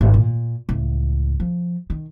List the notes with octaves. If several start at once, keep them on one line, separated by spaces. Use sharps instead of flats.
G#1
A#2
C#2 A2
F3
D#3